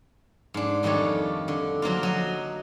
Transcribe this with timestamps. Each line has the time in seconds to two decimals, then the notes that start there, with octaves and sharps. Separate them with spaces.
0.54 G#2 D4
0.83 F2 D#3 G3 D4 A4 C#5
1.48 D3
1.82 F3 F#3 A#3 F4
2.03 F#3 D#5